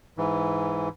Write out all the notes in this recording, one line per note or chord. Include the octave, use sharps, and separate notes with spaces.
G#2 E3